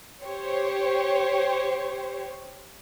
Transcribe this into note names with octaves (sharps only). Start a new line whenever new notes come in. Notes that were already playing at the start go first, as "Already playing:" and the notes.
G4 C5 C#5